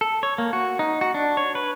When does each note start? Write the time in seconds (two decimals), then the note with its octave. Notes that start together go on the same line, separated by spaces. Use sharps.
0.01 A4
0.23 C#5
0.38 A#3
0.53 F#4
0.79 D#4
1.01 F#4
1.14 D4
1.37 C#5
1.55 B4